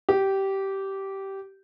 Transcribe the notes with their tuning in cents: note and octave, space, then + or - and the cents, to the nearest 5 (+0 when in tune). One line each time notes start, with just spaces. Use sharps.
G4 -15